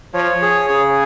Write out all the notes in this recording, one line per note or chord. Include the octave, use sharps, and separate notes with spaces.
F3 C#5
G#4
C#3 G#4